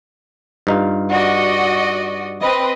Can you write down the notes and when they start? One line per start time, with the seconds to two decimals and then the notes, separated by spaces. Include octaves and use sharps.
0.67 G2 D#4 F4
1.10 F#4 D5 D#5
2.41 C4 B4 D#5